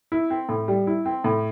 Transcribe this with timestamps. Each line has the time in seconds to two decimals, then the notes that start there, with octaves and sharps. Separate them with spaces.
0.12 E4
0.30 C4
0.49 A2
0.68 G3
0.87 E4
1.06 C4
1.24 A2